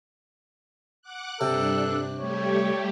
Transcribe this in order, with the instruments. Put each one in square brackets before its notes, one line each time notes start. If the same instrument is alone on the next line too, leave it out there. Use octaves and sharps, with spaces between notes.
[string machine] F#5 D6 F#6
[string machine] G2 D4 F#6 [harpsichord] C3 [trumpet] A4
[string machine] G3 A3 G4 [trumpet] C#5